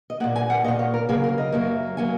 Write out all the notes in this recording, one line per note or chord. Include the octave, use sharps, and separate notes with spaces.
D#5
A#2 A#3 F#5
G#5
F#5
A#2 A#3 D#5
C#5
A#4
C#3 F#3 A#3 G#4
A#4
D#5
F#2 F#3 A#3
F#3 A#3 G#5